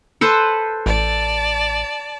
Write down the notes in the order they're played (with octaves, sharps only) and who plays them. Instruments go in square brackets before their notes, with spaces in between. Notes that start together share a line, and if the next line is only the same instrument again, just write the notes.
[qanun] A4 B4 C5
[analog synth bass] A1 [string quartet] D5 A5